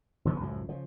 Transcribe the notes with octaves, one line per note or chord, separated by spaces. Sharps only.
E1 C#3 F3 B3
C#2 F#2 A2 F3
C#3 F3